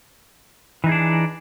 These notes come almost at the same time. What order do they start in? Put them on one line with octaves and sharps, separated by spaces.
E3 D#4 G#4 D4